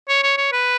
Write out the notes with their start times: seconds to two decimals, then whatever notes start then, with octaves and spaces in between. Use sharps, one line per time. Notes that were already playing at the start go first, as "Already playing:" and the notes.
0.09 C#5
0.23 C#5
0.37 C#5
0.52 B4